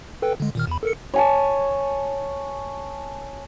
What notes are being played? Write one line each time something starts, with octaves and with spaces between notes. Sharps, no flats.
A4 B4 G5
D3 G#3
A#2 D#3 F6
E2 B5
A4 A#4 C#7
C#5 G#5 A5